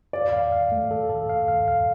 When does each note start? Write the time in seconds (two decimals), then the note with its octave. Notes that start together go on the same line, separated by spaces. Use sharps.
0.13 D5 F5
0.33 F5
0.52 F5
0.72 A3
0.91 A4
1.10 A4
1.29 F5
1.48 F5
1.68 F5